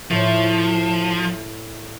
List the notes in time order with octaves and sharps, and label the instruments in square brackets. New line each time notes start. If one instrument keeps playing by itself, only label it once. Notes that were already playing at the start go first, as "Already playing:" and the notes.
[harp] A2 [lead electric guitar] F3